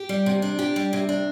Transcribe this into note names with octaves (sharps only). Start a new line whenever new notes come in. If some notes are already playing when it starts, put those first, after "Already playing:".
Already playing: G4
G3
C3
D4
G4
G3
C3
D4